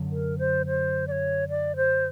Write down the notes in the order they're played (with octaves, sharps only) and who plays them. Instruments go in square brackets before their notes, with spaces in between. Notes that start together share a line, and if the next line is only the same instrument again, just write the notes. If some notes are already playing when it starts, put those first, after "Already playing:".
Already playing: [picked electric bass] F#2 D3 F#3
[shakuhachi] A#4
C5
C5
D5
C#5
D5
C5